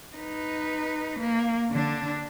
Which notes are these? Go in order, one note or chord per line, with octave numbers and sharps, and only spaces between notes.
D#4 B4
A#3
D3 D4